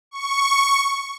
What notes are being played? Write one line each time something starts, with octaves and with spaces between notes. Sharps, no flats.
C#6